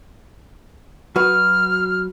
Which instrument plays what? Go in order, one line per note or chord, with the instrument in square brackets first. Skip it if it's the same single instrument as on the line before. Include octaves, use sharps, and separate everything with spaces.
[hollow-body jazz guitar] F#3 F#4 B4 [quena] F6